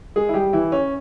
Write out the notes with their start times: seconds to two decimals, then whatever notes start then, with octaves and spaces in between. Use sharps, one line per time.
0.16 G#3 G#4
0.29 E4
0.34 G3 G4
0.53 E3 E4
0.72 C#4